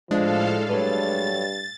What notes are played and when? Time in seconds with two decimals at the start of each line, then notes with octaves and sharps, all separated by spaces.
0.11 A2 F3 G#3 D4 A4 F5
0.69 G2 F#3 A4 B4 A6